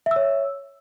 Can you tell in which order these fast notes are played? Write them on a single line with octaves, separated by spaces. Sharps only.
E5 E6 C#5